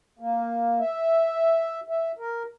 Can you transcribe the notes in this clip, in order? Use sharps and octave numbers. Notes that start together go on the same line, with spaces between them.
A#3
E5
E5
A#4